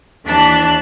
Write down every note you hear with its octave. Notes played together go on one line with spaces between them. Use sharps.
D#2 E3 D4 A5 F#6